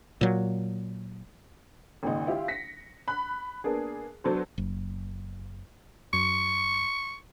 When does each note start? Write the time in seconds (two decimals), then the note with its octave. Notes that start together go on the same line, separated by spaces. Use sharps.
0.21 A#2 F#3
2.03 G#1 A#2 C#3 D#4
2.27 E4 F4 G4
2.48 A#6 B6 C#7
3.08 B5 F#6
3.64 A#3 B3 D4 G#4
4.24 F#3 B3 D4 A4 B4 C5
4.58 F#1
6.13 F#2 C#6